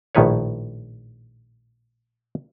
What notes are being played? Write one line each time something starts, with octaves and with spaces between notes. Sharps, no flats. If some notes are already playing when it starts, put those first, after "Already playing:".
A#1 A2 D#3 B4 C#5